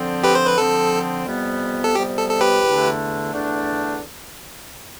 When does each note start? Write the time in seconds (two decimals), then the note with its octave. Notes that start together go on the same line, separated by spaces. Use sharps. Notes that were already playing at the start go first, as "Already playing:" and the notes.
Already playing: D3 F3 C4
0.24 G4 B4
0.35 C5
0.47 B4
0.58 D3 F3 C4 A4
1.27 F2 C3 G3 B3
1.84 A4
1.95 F2 C3 G3 B3 G4
2.17 A4
2.31 A4
2.41 G4 B4
2.64 E2 D3 A3 D4
3.32 E2 D3 A3 D4